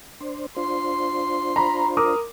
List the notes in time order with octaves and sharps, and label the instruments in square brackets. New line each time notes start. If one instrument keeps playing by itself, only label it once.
[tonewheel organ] D4 C5
[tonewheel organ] D4 F4 C5 [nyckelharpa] C6
[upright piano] A#5 B5
A#4 D6 D#6